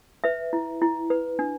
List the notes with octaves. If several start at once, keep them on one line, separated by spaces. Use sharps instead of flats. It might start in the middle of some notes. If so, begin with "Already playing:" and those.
B4 E5
E4
E4
B4
D4